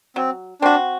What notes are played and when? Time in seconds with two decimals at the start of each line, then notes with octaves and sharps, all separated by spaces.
0.16 F#3 C4
0.62 C4 D4 F#4